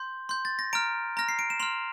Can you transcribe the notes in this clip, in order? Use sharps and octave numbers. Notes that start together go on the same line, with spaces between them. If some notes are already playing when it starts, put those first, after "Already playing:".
Already playing: C6 G6
C6 G6
A6
A#6
A#5 F6 D7
A#5 F6 A#6
C7
D7
E7
C6 F6 F7